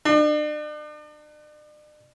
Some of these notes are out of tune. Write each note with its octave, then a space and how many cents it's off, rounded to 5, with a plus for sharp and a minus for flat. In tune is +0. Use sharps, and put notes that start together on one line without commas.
D4 +40